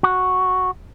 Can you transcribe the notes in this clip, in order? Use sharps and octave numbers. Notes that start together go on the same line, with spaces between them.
F#4